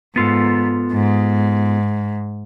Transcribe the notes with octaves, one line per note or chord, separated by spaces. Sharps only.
G#2 B3 F4 A4
G#2